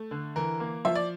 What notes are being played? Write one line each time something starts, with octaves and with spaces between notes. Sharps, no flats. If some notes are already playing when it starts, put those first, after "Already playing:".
Already playing: A3
D3
E3 A#4
A#3
F3 E5
D5